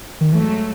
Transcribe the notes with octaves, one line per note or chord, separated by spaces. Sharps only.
D#3
G#2 E3 F#3 A3